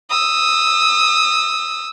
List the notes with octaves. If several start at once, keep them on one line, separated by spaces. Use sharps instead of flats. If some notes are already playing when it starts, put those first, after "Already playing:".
D#6 E6